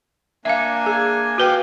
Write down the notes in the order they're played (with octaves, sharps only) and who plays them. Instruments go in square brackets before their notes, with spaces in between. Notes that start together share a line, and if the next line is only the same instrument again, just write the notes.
[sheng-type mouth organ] A#3 D4 G#5 [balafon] E5 F5
[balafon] G#4
[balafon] F#4 B4 G5 [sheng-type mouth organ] F5 D6